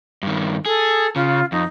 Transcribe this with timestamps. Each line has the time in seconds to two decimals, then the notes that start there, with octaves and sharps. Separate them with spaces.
0.23 G2 D#3
0.66 G#4 A4
1.16 C#3 F4
1.52 F2 D#4